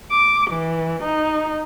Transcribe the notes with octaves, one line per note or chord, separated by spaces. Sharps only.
D6
E3
D#4